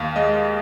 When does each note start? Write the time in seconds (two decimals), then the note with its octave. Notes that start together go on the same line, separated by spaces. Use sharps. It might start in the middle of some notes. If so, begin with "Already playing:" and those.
Already playing: D#2 F5
0.16 G#3 D#5